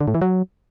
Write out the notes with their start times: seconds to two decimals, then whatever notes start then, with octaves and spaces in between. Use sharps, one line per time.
0.01 D3
0.08 A2
0.15 E3
0.22 F#3